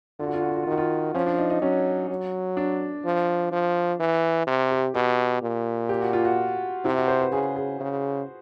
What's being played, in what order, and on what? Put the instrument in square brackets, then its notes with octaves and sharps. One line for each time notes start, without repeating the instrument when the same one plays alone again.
[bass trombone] D3 [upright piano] F4
[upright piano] F#4
F4
F#4
F4
F#4
F4
[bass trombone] D#3 [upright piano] F#4
[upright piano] F4
[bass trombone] F3 [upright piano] C#4
[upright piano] D4
D#4
D#4
[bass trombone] F#3 [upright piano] C#4
[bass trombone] F#3
[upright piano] D4
[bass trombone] F3
F3
E3
C3
[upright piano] G4
[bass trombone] B2 [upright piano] G4
[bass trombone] A#2
[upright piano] G4
F#4
F4
F#4
[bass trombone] C3 [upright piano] E4
[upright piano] F#4
C5
B4
[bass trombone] C#3 [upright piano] G#4
[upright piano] G#4
[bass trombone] C#3